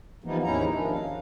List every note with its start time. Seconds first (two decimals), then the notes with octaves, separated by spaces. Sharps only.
0.24 E3 F3 G3 A#3 B3 D#4
0.43 D#2 G#2 C#4 D#4 E4 A#5
0.73 D#3 F3 D4
0.92 F5